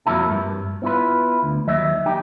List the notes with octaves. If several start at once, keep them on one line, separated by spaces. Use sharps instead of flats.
F2 D#3 F#3 A#3 E4 A5
G2
B3 E4 F4 B4
D2
D#2 F#3 D#5 E5
D#4 G4